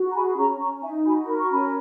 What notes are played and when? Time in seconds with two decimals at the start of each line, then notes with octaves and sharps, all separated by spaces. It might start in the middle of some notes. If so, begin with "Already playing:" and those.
Already playing: F#4
0.11 A#5
0.15 G#4 G#5 B5
0.38 C#4 A#5 C#6
0.60 C#4 A#5 C#6
0.83 D#4 E5 G#5
1.05 F#4 G#5 B5
1.28 A#4 B5
1.39 C#6
1.50 C#4 G#5 B5